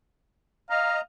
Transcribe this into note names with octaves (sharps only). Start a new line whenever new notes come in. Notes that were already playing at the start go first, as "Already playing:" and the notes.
D#5 F5 A#5